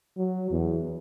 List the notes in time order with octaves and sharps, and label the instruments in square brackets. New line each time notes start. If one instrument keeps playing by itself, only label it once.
[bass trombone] F#3
E2